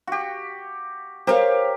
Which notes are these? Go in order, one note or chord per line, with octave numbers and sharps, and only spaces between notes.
F#4 G4
G4 A#4 C5 C#5 F5